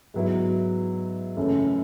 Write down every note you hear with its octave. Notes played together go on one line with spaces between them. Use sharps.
G#2 F#3 B3 E4
F#2 C#3 E3 A3 E4